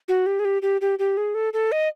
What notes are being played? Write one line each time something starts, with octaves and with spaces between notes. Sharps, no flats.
F#4
G4
G#4
G4
G4
G4
G4
G#4
A4
A4
D#5